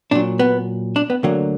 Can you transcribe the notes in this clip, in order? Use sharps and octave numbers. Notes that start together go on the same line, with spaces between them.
A#2 F#3 D4
B3
D4
B3
D2 D3 F#3 A#3